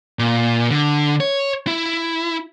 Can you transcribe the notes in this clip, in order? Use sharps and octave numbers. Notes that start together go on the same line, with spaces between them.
A#2
D3
C#5
E4